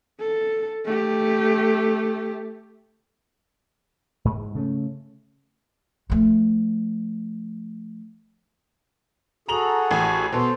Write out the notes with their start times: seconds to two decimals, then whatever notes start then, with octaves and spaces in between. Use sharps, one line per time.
0.20 A4
0.85 A3 G4
4.25 G#2 G#3
4.55 C#3 A3 C#4
6.10 F3 A3
9.48 F#4 G#4 A4 A#5 F7 F#7
9.91 A1
10.32 B2 B3 A4 C5